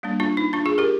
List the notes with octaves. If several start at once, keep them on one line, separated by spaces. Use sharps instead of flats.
G3 A#3 D4
D4 F4
D#4
D4 F4
F4 G#4
G4 A#4